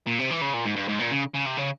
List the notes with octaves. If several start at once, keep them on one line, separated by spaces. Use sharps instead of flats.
A#2
C3
E3
C#3
A#2
G#2
G2
G#2
A#2
C#3
C#3
C3
C#3